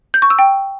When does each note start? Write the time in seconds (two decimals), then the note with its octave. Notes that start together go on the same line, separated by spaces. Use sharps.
0.14 G6
0.22 C#6
0.30 E6
0.39 G5